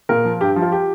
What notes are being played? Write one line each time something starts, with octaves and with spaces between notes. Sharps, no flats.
A#2 A#4
F3
G2 G4
F3
F4
G4